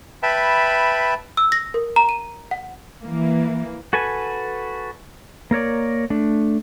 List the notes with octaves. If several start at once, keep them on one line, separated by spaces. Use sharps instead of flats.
B4 E5 G5 A5 B5
E6
A#6
A#4
A#5
D#7
F#5
E3 A#3
F#4 A4 B4 G#5
A#3 A#4 C#5 D5
A3 D4